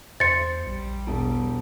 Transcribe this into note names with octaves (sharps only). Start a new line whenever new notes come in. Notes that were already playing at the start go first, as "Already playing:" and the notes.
E2 C5 A6 C#7
A#1 G3
E1